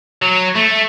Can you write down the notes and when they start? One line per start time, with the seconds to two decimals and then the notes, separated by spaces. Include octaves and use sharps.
0.22 F#3
0.56 A3